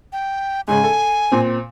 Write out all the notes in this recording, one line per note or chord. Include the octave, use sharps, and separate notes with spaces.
G5
G#2 C#3 G#5
A4
A#2 C4